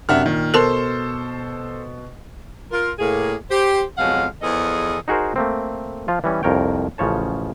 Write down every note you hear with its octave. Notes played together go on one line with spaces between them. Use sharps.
F#2 C3 D4 E5 F#5 F6
A#2 D#3
B2 A4 A#4 C5 A5 C6
F4 A#4
A2 A#3 G#4
G4 C5
F2 B2 F#3 G#3 F5 F#5
E2 E3 F3 G#4 A4 D#5
D#4 F#4 G#4 A#4 C5
A3 A#3 C4
F3 F4
E3 G3 C#4
C2 F2 A#4 C#5 G5
A1 C#3 F3 C#5 A5